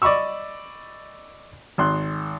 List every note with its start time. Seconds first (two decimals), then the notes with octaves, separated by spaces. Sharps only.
0.02 D5 D#5 B5 C#6 E6
1.78 G#1 C6 F#6